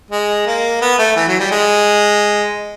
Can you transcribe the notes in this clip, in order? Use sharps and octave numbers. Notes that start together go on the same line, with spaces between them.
G#3
A#3
B3
A3
E3
F#3
G3
G#3